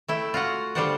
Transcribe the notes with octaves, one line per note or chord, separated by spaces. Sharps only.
A3 E4 G5
F4 F#4 F#5
D3 G3 F4 C5 D5 F#5